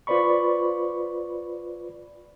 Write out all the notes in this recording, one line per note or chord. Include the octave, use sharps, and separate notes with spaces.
F4 B4 C5 D5 B5 C#6